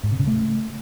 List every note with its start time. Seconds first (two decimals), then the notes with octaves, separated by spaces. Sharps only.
0.03 G#2
0.11 C3
0.19 C#3
0.27 A3